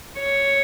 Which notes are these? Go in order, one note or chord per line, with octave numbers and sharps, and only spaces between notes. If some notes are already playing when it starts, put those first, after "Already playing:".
C#5